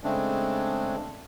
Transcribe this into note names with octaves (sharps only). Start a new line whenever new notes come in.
C#3 G#3 A3 C4 D4